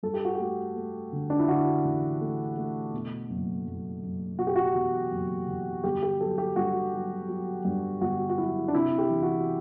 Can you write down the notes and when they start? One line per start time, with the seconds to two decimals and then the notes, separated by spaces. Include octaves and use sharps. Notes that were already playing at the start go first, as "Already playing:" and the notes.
0.03 G2 A4
0.14 G4
0.25 F#4
0.35 A3 G4
0.76 A3
1.12 D3
1.30 D4
1.39 E4
1.48 D3 F#4
1.84 A1
2.21 A3
2.57 A3
2.94 B2
3.29 F#1
3.66 F#1
4.02 F#1
4.38 B2 F#4
4.47 G4
4.56 F#4
4.75 E2
5.11 F#1
5.47 E2
5.84 G1 G4
6.03 G4
6.20 F#3 A4
6.38 G4
6.56 G2 F#4
6.93 F#3
7.29 F#3
7.65 G2
8.01 G1 F#4
8.29 F#4
8.38 F#3 E4
8.68 D4
8.74 C3 E4
8.98 G4
9.10 E3
9.23 F#4